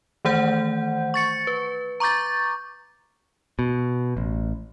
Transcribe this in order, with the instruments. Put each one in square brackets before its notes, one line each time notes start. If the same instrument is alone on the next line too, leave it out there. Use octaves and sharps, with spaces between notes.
[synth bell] D#3 E3 A3 C5 F#5 G6
C#6 A6 C#7
B4
A#5 C#6 D6 G6 A6
[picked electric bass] B2
A1